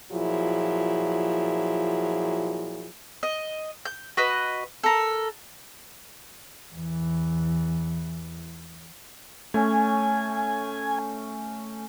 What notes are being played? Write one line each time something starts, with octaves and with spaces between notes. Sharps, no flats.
A#2 F3 F#3 E4 G#4
D#5
G6
F#4 B4 D#5
A4 A#4
E2 E3
A3 C#4 G#5